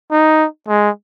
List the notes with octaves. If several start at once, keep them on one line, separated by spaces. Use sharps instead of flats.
D#4
G#3